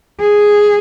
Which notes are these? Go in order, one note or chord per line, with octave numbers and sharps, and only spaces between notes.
G#4